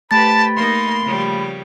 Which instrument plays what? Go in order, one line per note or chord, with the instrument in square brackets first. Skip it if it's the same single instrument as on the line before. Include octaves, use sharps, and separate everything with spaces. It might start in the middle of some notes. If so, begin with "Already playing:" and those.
[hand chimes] A3 A6 [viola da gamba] G4 B4 C5 [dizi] A5 [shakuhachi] B5
[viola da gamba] A#3 D#4 [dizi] C6
[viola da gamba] C#3 F3 G3